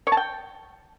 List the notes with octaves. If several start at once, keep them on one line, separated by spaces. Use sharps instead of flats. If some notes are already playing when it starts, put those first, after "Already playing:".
C#5
A5
G5